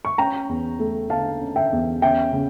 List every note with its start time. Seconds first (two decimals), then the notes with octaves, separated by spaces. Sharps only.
0.05 C#6
0.18 C#4 G5 A#5
0.49 E2
0.79 A3
1.10 D3 F5 A5
1.41 C#4
1.56 E5 G5
1.72 E2
2.02 C#4 E5 G5
2.32 C#3